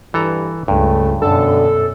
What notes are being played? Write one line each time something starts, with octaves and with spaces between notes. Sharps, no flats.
G2 E3 A4 A#5
C#2 G2 A3
F#2 B2 D3 A4